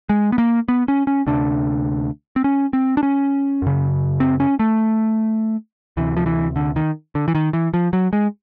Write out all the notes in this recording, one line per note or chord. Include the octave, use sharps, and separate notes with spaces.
G#3
B3
A#3
B3
C#4
C#4
D2 C3 D4
C4
C#4
C4
D4
C#4
F#2 C#3
C4
C#4
A3
D2 C3 E3
F3
E3
D3
D#3
D3
E3
D#3
E3
F3
F#3
G#3